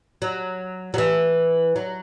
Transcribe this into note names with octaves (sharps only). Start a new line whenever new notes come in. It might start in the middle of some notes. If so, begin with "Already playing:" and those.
F#3
F#3
E3
F#3